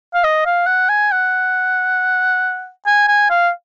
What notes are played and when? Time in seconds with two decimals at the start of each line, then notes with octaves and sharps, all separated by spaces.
0.14 F5
0.24 D#5
0.46 F5
0.67 F#5
0.89 G#5
1.12 F#5
2.86 G#5
3.08 G#5
3.30 F5